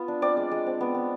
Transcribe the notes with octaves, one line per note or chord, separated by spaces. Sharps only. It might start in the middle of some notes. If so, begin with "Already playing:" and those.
Already playing: B3 F4
D4
C4 D5
G#3
G#3
C4
B3
B3